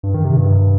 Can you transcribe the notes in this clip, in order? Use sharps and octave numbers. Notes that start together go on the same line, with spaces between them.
G2
D#3
C3
G2